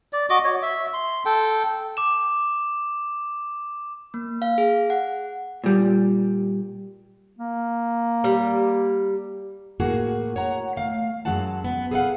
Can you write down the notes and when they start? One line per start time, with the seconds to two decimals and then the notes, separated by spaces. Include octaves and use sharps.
0.13 D5
0.30 F#4 D#5 D6
0.44 C#5
0.62 E5
0.94 C6
1.26 A4 G5
1.97 D6 E7
4.14 A#3
4.42 F5
4.58 G#4
4.90 F#5
5.64 A#2 G3
7.39 A#3
8.24 G3
9.80 A2 A#3 F#4 G#4
10.36 C#5 F#5 A#5
10.77 A3 F5
11.25 F#2 F#3 G#3 F#5 A5
11.64 B3
11.91 G#4 A4 B4 D#5 F5 F#5